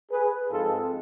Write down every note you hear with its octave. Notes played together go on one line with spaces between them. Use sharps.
G#4 B4
G#2 F3 G#3 C4 F4 A4